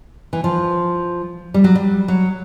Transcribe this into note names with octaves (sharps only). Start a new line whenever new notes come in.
E3
F3
G3
F#3
G3
F#3